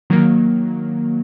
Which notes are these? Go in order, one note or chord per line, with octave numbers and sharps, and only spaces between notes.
D#3 F#3 A#3